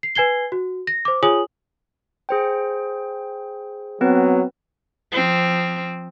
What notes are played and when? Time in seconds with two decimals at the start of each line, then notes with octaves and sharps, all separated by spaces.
0.03 C7
0.15 B4 G#5 G#6 C7 G7
0.52 F#4
0.87 A#6
1.05 C5 D6
1.23 F4 G#4 C#5 G#5 D#6 F#7
2.29 G#4 C5 G5
4.01 F#3 B3 C4 B4
5.12 F3 C4